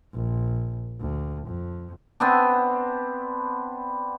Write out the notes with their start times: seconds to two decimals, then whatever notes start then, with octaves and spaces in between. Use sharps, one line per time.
0.13 A#1
1.00 D2
1.46 F2
2.20 B3 C4 D4